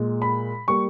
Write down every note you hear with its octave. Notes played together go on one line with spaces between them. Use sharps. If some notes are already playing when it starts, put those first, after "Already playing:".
Already playing: A#2 G#3
B5
G3 A#3 C#6